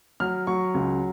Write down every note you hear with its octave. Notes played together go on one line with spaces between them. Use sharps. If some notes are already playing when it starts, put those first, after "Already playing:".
F#3 F6
F#3 C#6
C#2